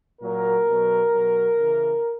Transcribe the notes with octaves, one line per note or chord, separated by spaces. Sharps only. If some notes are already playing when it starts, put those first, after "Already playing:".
A#2 F#3 A#4
B2 F#3
B2 F#3
C#3 E3